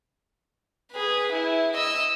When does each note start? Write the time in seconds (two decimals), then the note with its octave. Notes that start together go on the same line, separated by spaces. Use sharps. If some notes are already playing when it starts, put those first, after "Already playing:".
0.92 G#4 B4
1.33 E4
1.74 D#5 E6